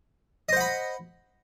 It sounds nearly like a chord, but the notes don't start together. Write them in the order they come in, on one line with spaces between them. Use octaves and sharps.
D#5 C5 F#5 B5